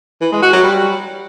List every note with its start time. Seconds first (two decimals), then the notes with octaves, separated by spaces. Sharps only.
0.21 E3
0.32 G#3
0.42 F#4
0.53 F#3
0.63 G3